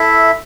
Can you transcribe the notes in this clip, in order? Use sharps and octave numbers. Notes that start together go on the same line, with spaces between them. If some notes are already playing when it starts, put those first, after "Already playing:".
Already playing: E4 A4 E5